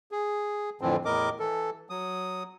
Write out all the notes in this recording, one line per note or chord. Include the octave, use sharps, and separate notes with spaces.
G#4
F2 A2 D3 E3 F3 C4
E2 A2 A#4 D#5 D6
E3 A4
F#3 D#6